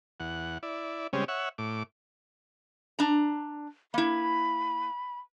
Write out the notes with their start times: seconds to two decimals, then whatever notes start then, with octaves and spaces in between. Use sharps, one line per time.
0.20 E2 F#5
0.63 E4 D5
1.13 C#3 G3 G#3 C4 C#4
1.28 C#5 E5 F#5
1.58 A2 D6
2.99 D4 A#5
3.94 A#3 E4 B5